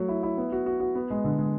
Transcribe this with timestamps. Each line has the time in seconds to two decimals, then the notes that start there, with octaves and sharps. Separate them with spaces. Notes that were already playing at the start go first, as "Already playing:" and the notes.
Already playing: F#3 A3
0.08 E4
0.23 E4
0.37 B3
0.52 F#4
0.66 F#4
0.80 F#4
0.95 B3
1.10 G#3
1.24 D3
1.39 G#3